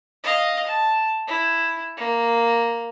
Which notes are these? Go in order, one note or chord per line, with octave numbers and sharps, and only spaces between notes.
D#5 F5
A5
E4
A#3